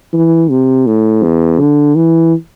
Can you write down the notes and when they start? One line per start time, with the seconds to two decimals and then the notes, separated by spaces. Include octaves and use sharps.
0.13 E3
0.50 C3
0.87 A2
1.23 E2
1.60 D3
1.96 E3